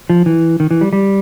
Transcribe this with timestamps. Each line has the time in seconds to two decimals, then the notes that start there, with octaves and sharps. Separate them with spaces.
0.10 F3
0.26 E3
0.60 D#3
0.71 E3
0.81 G3
0.93 G3